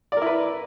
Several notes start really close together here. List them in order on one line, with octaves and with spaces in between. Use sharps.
D5 A#4 E4 B4